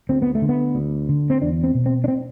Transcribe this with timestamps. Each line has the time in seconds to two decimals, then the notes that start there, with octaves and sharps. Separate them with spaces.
0.09 D2 C4
0.22 B3
0.35 A3
0.42 D3
0.49 B3
0.75 D2
1.09 D3
1.30 C4
1.42 E2 D4
1.64 C4
1.75 B2
1.86 C4
2.04 D4
2.08 C4